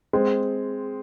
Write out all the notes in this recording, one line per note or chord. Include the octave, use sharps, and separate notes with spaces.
G#3 C4